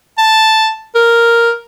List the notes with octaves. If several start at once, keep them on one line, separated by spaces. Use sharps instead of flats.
A5
A#4